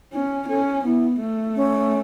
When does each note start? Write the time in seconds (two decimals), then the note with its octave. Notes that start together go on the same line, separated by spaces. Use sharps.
0.13 C#4
0.49 C#4 A4
0.84 B3 E4
1.21 A3
1.56 C#4